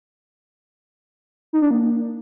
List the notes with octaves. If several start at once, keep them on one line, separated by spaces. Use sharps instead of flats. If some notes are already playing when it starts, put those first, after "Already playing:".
D#4
D4
A#3